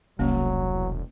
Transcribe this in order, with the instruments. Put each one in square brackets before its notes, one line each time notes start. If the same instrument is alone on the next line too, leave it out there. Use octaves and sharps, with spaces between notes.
[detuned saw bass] E1 [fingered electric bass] C2 [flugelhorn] F#3 [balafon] A#3 C#4